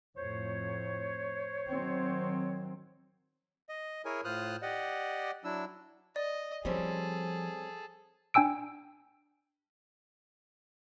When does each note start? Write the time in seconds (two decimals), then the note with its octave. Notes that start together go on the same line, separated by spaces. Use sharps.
0.16 F2 A2 C5 C#5
1.67 D#3 F#3 C4
3.69 D#5
4.05 E4 G#4 A#4 C#5 G#5
4.25 A2 F4 C5 D#6 F6 F#6
4.62 G4 D5 D#5 F#5
5.44 F#3 D4 E4 E6
6.16 D5 D#5
6.65 F3 G3 C4 C#4 G#4 A4
8.34 D4 G5 G#5 E6 D7